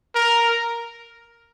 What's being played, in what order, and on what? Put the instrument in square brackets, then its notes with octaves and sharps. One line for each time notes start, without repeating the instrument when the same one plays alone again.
[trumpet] A#4